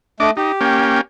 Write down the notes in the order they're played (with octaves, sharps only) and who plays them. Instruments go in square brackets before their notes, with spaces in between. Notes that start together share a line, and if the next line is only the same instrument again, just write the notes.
[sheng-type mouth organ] A3 [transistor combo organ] D4 D#5 D6
[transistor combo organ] D#4 [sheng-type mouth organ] G4
[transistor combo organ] A#3 C#4 G5